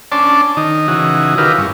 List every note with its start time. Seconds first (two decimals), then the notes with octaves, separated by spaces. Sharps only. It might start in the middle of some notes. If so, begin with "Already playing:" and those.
0.12 C#4 D4 D5 A5 C6
0.57 D#3 D#4
0.88 C#3 E3 D#4 F#4
1.38 D#3 E4 F4 G4 A#4 B4
1.58 G2 C#4